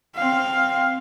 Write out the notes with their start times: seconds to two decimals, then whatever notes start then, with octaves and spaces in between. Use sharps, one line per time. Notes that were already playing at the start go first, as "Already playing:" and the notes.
0.15 C4 F5